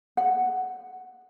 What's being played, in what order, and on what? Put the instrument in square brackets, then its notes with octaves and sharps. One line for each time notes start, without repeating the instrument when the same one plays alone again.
[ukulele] F#5